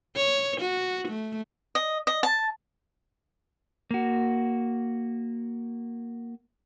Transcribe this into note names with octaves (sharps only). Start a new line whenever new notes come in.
C#5
F#4
A3
D#5
D#5
A5
A#3 F#4